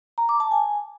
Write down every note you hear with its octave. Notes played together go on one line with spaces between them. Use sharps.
A#5
D6
A5
G#5